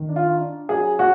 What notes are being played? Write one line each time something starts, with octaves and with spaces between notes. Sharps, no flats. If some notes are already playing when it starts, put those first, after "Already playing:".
Already playing: D#3
D4
F4
D4
F#3 G#4
F#3 F#4